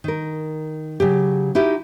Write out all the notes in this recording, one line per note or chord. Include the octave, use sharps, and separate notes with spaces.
D#3 A#4
C#3 F#3 G4
D#4 E4 F#4 G4